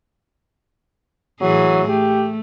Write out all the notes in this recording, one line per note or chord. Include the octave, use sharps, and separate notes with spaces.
A2 E3 F#3 G#4
A3 G4